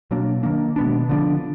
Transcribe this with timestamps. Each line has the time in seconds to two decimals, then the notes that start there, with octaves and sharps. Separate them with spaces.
0.11 B2 F#3 A#3 D4
0.43 D#3 A#3 D4
0.76 B2 G#3 B3 D4
1.09 D3 F3 B3 D4